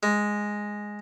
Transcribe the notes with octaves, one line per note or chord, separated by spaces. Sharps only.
G#3